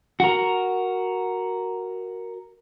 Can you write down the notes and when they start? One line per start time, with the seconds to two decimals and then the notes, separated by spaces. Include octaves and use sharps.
0.20 F#4 A#4